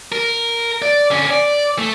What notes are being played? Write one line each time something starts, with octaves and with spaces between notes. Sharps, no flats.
A#4
D5
D3 C#4
D5
A3